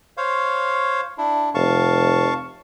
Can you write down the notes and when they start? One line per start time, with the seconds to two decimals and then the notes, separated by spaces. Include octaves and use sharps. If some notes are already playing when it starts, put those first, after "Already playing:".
0.17 C5 C#5 F5
1.18 D4 E4
1.55 F1 F5 A5 C#6